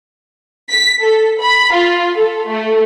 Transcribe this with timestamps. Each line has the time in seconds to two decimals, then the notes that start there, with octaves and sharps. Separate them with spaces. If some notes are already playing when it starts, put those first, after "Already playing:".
0.70 B6
1.01 A4
1.41 B5
1.73 F4
2.17 A4
2.48 A3